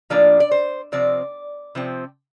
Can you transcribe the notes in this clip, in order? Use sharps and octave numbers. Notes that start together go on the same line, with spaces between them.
A2 F3 A#3 D4 D5
D5
C5
C3 F3 C4 D5
C3 F3 C4